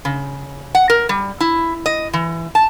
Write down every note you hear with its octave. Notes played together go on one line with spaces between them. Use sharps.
C#3
F#5
A#4
G3
E4
D#5
E3
A5